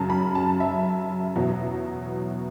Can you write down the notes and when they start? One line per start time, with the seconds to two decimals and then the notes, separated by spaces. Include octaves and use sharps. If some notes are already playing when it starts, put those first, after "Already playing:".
Already playing: F#2 C#3 F#3 A5
0.10 B5
0.35 A5
0.60 E5
1.36 E2 B2 F#3